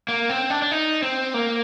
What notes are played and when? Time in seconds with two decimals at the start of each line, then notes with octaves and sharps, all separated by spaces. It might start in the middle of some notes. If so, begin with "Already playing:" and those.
0.08 A#3
0.29 C4
0.50 D4
0.62 D4
0.71 D#4
1.02 C4
1.34 A#3